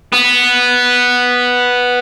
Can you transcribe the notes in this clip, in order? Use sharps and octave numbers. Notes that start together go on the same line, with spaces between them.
B3